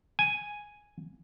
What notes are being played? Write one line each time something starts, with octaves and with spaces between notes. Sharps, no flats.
G#5